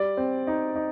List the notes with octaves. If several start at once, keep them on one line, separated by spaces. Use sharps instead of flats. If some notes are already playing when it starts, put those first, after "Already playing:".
Already playing: G3 D5
C4
D#4
D#4